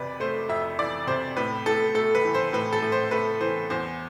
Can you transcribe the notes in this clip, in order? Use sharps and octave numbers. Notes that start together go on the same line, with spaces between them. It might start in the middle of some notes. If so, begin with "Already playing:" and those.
Already playing: F2 C3 E3 B4 D5
A3 C5
F2 E5
E3 D5
C3 C5
A2 B4
A2 A4
A3 A4
B4
E3
C5
A2 B4
A4
A2
C5
A3 B4
E3 C5
E2 C5